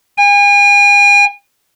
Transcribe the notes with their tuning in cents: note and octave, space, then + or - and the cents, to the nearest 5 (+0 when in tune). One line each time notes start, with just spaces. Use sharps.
G#5 -40